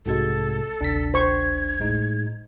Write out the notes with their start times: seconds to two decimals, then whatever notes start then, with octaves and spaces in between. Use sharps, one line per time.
0.06 B1 G#2 C3 G#3 F#4 A4 G#6
0.81 G#1 D2 C3 D4 B6
1.14 C5 C#6 G#6
1.80 A2 G#3 D#4